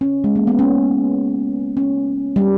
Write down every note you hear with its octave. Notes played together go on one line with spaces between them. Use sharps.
C#4
G#3
A#3
B3
C#4
C#4
G3